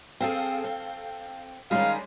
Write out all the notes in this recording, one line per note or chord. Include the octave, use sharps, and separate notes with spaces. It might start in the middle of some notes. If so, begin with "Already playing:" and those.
C4 G#4 A4 F5 G5
C4
D#3 G3 G#3 C#4 G#4 F5